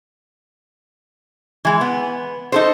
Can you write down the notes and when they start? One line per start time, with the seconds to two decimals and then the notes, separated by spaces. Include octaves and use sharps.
1.65 E3 G#3
1.81 B3
2.52 D#4 A4 C5